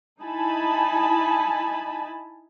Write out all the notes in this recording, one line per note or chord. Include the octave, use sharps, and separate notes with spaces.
D#4 E4 G#5 A5 B5